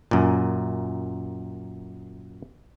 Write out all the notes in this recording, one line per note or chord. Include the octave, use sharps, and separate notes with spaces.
F#2 A#2